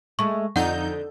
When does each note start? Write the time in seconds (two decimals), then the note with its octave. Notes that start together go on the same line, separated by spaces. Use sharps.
0.19 G#3 A3 C#6
0.56 F2 D3 D#4 F#5 G6